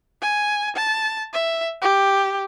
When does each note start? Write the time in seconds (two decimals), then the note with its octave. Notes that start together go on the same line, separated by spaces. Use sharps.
0.22 G#5
0.76 A5
1.33 E5
1.82 G4